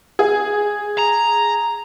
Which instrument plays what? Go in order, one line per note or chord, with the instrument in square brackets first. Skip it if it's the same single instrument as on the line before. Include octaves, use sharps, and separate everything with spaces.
[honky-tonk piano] G#4
[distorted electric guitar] A#5